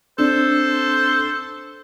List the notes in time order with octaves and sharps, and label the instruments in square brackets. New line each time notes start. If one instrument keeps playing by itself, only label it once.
[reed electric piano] C4 D4 [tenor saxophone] A4 [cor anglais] C5